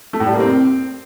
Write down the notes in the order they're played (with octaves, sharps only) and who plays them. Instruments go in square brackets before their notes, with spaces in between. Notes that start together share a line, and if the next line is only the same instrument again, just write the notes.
[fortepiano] A3
A2
G3
A#3
C4